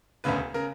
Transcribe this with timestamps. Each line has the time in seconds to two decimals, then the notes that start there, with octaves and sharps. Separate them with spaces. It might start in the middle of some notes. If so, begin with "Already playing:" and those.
0.24 E1 D2 C#3 B4
0.54 C#3 A#4